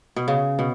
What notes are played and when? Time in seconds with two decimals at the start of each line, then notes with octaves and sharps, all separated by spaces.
0.16 B2
0.28 C#3
0.59 B2